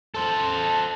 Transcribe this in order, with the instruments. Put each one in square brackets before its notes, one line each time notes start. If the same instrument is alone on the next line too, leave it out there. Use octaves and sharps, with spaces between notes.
[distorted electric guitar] A4 C5